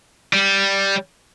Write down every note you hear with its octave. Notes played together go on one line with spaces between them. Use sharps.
G3